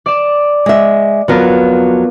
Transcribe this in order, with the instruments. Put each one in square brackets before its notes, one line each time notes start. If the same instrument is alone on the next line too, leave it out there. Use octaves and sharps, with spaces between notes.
[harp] D5 E7
[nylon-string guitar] G#3 E5
[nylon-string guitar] F2 F#3 [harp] B3 F4 A#4